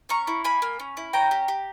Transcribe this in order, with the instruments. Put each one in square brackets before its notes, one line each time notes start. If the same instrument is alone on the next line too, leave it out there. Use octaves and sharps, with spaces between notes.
[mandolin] C#4 A#5 C#6
E4
A#3 G#5 B5
A#3
C#4
E4
C#4 G5 A#5
G4
G4